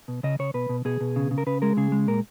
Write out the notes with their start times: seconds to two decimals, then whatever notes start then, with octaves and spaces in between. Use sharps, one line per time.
0.08 B2
0.23 C#3 D#5
0.39 C#3 C#5
0.54 B2 B4
0.69 B2
0.85 B2 G#4
1.01 B2
1.16 C#3
1.31 C#3
1.38 A#4
1.47 C#3 B4
1.62 G#3 A#4
1.77 C#3 G#4
1.92 G#3
2.07 A#2 A#4